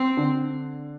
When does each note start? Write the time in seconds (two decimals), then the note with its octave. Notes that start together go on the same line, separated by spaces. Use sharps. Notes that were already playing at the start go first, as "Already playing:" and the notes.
Already playing: C4
0.17 D3